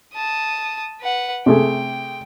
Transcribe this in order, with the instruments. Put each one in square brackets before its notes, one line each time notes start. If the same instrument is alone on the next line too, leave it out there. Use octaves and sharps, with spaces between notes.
[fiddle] A5 D#6
B4 F#5
[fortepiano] C3 A3 G#4 [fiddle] G5